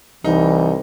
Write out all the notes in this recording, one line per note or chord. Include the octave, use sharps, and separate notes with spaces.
C2 E3 D#4